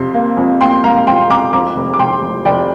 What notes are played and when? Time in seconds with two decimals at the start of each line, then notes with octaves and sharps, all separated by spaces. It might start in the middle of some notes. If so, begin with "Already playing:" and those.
Already playing: F2 C3 C6
0.14 A#3
0.37 F2
0.61 A#3 G5 C6
0.84 A#3 F5 A#5
1.07 F2 G5 C6
1.30 C3 A#5 D6
1.53 F2 A#5 D6
1.76 F1
1.94 D6
1.99 F1 G5 C6
2.22 F1
2.45 F1 D5 G5